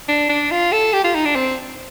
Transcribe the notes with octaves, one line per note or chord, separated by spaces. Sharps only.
D4
D4
F4
A4
G4
F4
D#4
D4
C4